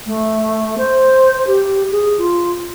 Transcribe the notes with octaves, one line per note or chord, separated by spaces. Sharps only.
A3
C5
G4
G#4
F4